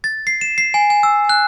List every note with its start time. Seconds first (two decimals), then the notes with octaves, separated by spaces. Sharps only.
0.04 A6
0.27 C7
0.41 E7
0.58 C7
0.74 G#5
0.90 G#5
1.03 E6
1.29 F#6